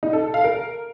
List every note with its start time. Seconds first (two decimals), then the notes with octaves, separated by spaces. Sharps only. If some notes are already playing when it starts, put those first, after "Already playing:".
0.03 D#4
0.13 A4
0.24 A4
0.34 F5
0.44 A#4